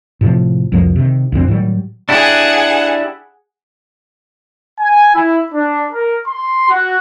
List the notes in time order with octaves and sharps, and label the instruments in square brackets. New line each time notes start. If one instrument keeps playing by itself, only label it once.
[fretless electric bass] A2 C3 D#3 F3
C2 F2 F3 A#3
C3 D#3
B1 F2 D3 C4
A2 D#3 F#3 G3
[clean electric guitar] D4 E4 G4 [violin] G#4 F#5
[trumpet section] G#5
E4
D4
A#4
C6
F#4